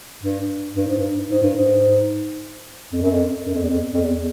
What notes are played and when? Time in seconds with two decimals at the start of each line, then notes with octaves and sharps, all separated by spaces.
0.23 G2
0.77 G2
0.87 G#2
0.98 G2
1.30 G#2
1.43 G2
1.56 G#2
2.93 F2
3.02 F#2
3.11 F2
3.47 F#2
3.54 F2
3.62 E2
3.69 F2
3.94 F2
4.01 E2